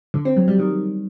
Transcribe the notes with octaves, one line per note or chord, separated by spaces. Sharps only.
D3
C4
F#3
G3
D#3